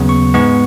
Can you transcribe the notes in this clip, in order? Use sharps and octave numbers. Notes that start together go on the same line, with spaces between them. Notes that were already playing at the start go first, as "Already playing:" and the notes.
Already playing: D#2 C#3 F#3 B3
C#6
G#2 G#3 B3 C#6